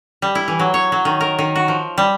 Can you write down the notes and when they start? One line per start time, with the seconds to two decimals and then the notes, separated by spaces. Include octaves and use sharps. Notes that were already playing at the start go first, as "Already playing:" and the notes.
0.22 G3
0.35 E4
0.48 E3
0.59 F#3
0.74 C#5
0.92 F#3
1.05 D#3
1.21 A#4
1.39 D#3
1.56 F#4
1.68 F3
1.98 G3